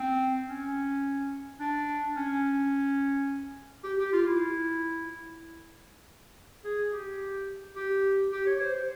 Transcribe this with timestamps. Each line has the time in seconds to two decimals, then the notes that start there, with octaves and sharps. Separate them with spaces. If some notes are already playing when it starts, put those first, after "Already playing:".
Already playing: C4
0.49 C#4
1.60 D4
2.16 C#4
3.84 G4
3.99 G4
4.13 F4
4.26 E4
6.64 G#4
6.93 G4
7.76 G4
8.32 G4
8.46 C#5
8.60 C5
8.74 C5